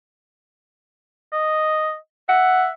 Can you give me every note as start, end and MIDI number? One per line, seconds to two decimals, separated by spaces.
1.33 1.96 75
2.29 2.71 76
2.29 2.68 78